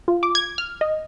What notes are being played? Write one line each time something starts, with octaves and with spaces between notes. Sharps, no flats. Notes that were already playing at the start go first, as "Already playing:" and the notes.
F4
D6
G#6
F6
D#5